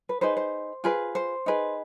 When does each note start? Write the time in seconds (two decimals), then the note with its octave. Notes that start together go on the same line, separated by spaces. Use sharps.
0.09 B4
0.21 D#4 G#4 B4 C5
0.37 C5
0.84 F4 G#4 B4
1.15 C5
1.46 D#4 G#4 B4